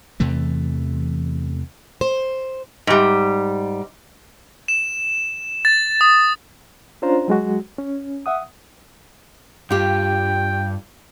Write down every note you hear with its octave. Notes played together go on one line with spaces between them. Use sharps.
E2 C3 E3 A3
C5
G#2 G3
E7
A6
D#6
C#4 D4 F4 C5 A#5
F#3 G#3 F#4
C#4
E5 F#5 D#6
G2 F4 G4 G5